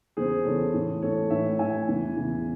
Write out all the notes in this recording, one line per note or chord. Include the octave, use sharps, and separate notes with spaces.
E2 C#3 E3 G#4 C5
E2 C#3 E3 A4 C#5
A2 E3
A2 E3 A4 C#5
A2 E3 C#5 E5
A2 E3 E5 G#5
E2 C#3 E3
E2 C#3 E3